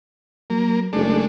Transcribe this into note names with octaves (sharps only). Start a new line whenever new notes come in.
F#3 A#3
F#1 G#3 A3 D4